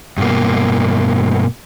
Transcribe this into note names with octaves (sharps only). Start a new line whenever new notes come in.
G2 B2 A#3